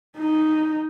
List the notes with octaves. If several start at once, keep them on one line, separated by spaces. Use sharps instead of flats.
D#4